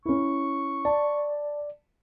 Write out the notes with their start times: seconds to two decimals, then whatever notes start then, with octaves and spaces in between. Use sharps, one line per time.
0.05 C#4 E4 C#6
0.85 D5 A5